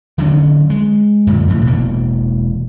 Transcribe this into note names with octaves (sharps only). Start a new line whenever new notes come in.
D3 D#3 F#3 C#4
G#3
F#2 A#2 D3
F2 A2
E1 B2 E3 A#3